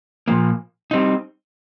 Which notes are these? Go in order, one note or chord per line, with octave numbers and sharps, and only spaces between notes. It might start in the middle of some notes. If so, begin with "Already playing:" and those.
A#2 F3 A#3
G3 C4 D#4